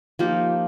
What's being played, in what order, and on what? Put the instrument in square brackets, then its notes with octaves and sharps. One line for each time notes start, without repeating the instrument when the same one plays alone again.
[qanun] F3 A#3 D#4 G4